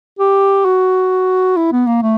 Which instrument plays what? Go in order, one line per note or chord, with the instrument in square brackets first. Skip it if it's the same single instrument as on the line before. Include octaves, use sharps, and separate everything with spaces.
[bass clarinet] G4
F#4
E4
B3
A#3
A3